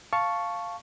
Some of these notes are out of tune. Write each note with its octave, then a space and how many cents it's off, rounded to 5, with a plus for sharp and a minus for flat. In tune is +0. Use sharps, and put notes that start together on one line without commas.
F5 +0 A5 +0 C#6 +0